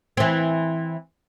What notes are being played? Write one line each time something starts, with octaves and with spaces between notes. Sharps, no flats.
E3 C4